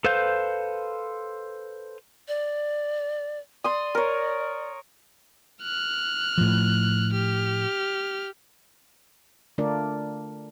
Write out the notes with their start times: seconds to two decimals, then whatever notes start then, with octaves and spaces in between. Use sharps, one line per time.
0.04 A4 B4 C5 F5 G6
2.28 D5
3.64 D5 C6 D#6
3.95 A#4 C#5
5.63 F6 F#6
6.38 A2 F3
7.13 G4 F6
9.58 D3 A3 D4 F4 A#4 D5